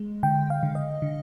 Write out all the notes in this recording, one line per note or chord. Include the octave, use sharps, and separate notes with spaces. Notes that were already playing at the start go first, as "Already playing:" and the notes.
Already playing: G#3
D3 G5
F5
D3
D#5
D3